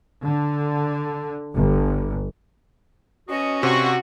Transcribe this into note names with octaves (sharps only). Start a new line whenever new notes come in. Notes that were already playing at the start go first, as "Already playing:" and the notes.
D3
G1
B2 C#4 F#4 D#5
G2 C3 F#4 C6 C#6